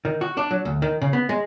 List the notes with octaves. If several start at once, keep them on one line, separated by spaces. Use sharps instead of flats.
D#3
F#4
D4
F#3
D2
D#3
C#3
B3
G#3